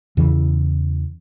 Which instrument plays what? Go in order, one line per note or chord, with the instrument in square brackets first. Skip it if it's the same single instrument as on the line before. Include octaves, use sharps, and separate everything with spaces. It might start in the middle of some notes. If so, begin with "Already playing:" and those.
[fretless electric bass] E2 C#3 E3